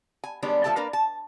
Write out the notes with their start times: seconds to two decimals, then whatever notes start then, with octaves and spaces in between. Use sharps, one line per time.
0.24 G#5
0.43 D#3 G3 G#3 B3 C#4 D4
0.64 F3 A3 A4 G5 A5
0.76 A#3 D4 A#4 B4
0.93 A5